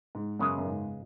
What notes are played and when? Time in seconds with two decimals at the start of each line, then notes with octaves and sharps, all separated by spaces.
0.15 G#2
0.39 F#2 C#3 G#3 B3 G#4
0.58 F#2
0.65 G#2